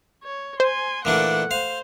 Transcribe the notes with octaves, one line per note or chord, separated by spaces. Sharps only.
C#5
C5 G#5 C6
A#2 E3 A3 D4 F#5
C5 F5